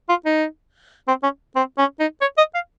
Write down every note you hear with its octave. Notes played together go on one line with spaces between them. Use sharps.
F4
D#4
C4
C#4
C4
C#4
D#4
C#5
D#5
F5